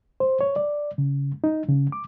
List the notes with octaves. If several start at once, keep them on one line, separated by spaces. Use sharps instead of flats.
C5
C#5
D5
C#3
D#4
C#3
D6